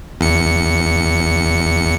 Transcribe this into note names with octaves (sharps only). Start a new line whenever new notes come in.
E2 C#7